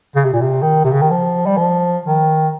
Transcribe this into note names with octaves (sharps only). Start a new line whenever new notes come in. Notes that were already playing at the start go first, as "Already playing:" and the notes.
C#3
C3
A#2
C3
D#3
C3
C#3
D#3
F3
G3
F3
D#3